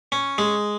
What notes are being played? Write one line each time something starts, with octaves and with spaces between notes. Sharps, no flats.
C#4
G#3